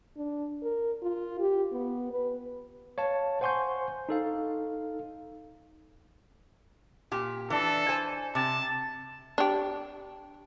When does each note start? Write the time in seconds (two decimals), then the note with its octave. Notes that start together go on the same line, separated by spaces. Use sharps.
0.17 D4
0.63 A#4
1.02 F4
1.40 G4
1.72 B3
2.11 B4
2.98 C#5 F5 A5
3.41 C5 F#5 G#5 C6 C#6 G6
4.09 D#4 A4 F5
7.12 A#2 G4
7.50 E3 D4 A4
7.89 C5 G#5
8.35 C3 A5
9.38 D4 G4